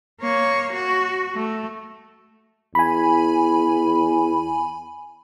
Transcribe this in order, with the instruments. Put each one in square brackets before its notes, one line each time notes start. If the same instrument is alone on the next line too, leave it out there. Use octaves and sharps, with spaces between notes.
[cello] A#3 C#5
F#4
A3
[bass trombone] E2 [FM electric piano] G#5 B5